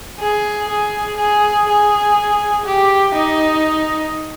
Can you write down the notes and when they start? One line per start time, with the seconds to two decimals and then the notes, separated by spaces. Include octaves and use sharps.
0.19 G#4
0.68 G#4
1.17 G#4
1.67 G#4
2.65 G4
3.15 D#4